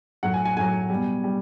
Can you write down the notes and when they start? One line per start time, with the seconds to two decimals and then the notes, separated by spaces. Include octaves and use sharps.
0.23 A2 F#3 F#5
0.34 G#5
0.45 G#5
0.56 A2 F#3 G#5
0.90 B2 G3
1.24 G3